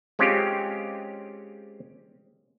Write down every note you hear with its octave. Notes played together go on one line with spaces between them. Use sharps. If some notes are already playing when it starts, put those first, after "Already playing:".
G#3 C4 C#4 F4 G4